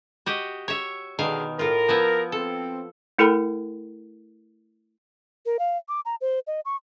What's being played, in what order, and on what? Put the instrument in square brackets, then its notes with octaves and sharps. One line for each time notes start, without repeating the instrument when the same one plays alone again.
[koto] F#4 G4 D#5
C#5 E5
[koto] B2 D#3 F5 [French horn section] D3 G#3
[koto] A2 F4 [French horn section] A#4
[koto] F3 B3 E4
[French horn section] C4 [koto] A4
[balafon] A3 E4 A4 A#4 G5 B5
[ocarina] A#4
F5
D6
A#5
C5
D#5
C#6